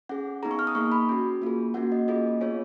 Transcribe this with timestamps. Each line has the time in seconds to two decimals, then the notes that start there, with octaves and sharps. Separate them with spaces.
0.09 C#4 G#4 F#5
0.43 B3 D#4 G#4 A#5
0.51 C#6
0.59 F6
0.67 D#6
0.75 A#3 D#4 G#4 C#6
0.92 B5
1.09 C#4 F#4
1.42 A#3 F4 G#4
1.74 A#3 C#4 F#4 F#5
1.92 D#5
2.08 A#3 C#4 F4 G#4 D#5
2.41 B3 F4 G#4 C#5